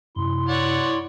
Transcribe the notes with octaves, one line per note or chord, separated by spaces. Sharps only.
F#2 C3 E4 C6
C#5 D5 F#5